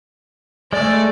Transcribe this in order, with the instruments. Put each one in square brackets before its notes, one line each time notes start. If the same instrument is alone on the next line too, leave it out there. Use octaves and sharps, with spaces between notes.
[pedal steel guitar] G#3 A3 [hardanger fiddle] D5